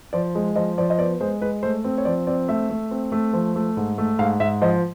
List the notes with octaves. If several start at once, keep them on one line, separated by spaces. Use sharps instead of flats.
F3 D5
G#3
F3 D#5
F3 D5
D#5
B3 D5
G#3 C5
G#3 B4
A3 C5
C4
C#5
F3 D5
C4 D5
A3 E5
A3
C4
A3
F3
A3
G#2
A3
G#2 F5
G#2 E5
F3 D#5